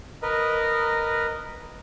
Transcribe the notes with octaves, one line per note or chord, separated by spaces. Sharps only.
A#4 B4 D#5